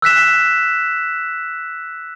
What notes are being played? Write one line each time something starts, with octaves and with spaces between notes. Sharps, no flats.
E6 F#6 B6 E7